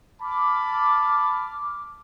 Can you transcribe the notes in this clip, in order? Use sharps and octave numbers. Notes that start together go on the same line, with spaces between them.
A5 B5 D6 F6